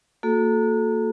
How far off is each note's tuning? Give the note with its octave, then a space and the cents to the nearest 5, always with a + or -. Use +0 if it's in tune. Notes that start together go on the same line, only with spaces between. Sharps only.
A#3 -30 F#4 -35 A4 -20